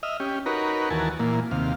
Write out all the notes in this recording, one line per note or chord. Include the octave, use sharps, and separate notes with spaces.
D#5 E5 F6
C#4 G4
D#4 F#4 A#4 B4 C#5
D#2 E3 F#4 A#4 G#5 A5
A#2 E3 A#3
D#2 C3 F5